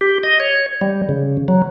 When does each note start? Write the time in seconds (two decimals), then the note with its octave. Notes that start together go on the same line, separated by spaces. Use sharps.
0.01 G4
0.23 D#5
0.40 C#5
0.81 G3
1.09 C#3
1.48 F#3